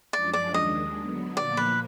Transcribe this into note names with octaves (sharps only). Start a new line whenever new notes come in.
F#2 F3 G#3 D4 D5
D5
D#2 D#3 G#3 D4 D#5
D3 F#3 B3
A#2 F3 A#3 D5
B4